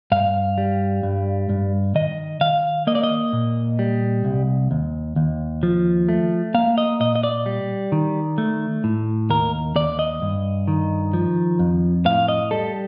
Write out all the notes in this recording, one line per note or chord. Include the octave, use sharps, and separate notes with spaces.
G2 F5
G3
G2
G2
D#3 D#5
D#3 F5
A#3 D#5
D5
D#5
A#2
G3
C2
D#2
D#2
F3
A3
A#3 F5
D#5
A#2 D#5
D#5
D5
G3
D#3
A3
A2
D#2 A#4
D#2 D5
D#5
G2
D#3
F3
F2
A2 F5
D#5
G3 A4